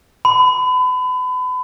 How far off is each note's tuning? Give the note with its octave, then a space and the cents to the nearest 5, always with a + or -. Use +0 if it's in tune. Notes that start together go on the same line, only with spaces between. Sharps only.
B5 +35